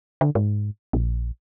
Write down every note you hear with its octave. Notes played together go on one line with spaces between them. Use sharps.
D3
G#2
A#1